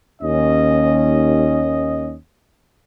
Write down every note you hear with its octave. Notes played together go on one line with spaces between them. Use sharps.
D#2 C#4 D#5